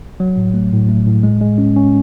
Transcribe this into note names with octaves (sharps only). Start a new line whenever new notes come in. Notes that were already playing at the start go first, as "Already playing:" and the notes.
F#3
A2
A3
A2
A3
A2
G#3
G#3
C#4
C#4